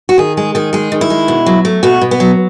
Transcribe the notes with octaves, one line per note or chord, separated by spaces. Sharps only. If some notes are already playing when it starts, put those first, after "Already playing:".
F#4
D#3 G#4
G#3 G#4
D#3 G#4
G#3 G#4
D#3
E4
G#3
B2
F#3
A3
B2 F#4
B2
B3
F#3